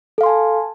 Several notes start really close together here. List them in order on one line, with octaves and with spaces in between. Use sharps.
A4 F5 C6 G#5 A5